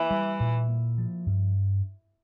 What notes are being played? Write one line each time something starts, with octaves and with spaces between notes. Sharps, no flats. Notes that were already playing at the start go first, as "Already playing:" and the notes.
Already playing: E3 A#3
G3
A#2
A#3
F3
G2